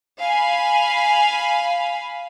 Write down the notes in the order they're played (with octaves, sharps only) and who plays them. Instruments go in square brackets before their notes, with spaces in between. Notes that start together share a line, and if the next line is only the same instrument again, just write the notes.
[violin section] F5 G#5 B5